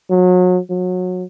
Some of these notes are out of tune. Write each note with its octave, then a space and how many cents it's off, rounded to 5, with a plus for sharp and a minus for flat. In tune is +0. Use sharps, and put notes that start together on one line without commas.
F#3 -30
F#3 -25